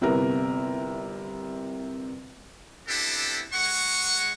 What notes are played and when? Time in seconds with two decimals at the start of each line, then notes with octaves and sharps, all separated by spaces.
0.01 G1 C3 B3 E4 A#4 B4
2.88 B3 C4 D4 E4 G4 A4
3.53 G#3 F#5 C#6